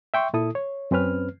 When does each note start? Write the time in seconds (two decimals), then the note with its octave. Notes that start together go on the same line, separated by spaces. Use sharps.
0.14 E5 G5 C6 C#6
0.33 A#2 E4 A4 D#6
0.55 C#5
0.91 F#2 C4 C#4 B4 F6